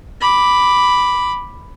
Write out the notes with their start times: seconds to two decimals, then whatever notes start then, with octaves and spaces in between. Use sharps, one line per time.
0.21 B5 D6